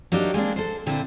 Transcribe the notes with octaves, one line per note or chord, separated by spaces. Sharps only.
F#3 A#3 D4 D#4 G4
G#3 A#3 C4 D4
A4 C5
A#2 D3 C4 E4